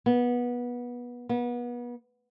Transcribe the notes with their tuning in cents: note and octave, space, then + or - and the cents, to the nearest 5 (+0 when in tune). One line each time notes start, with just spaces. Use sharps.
B3 -20
B3 -30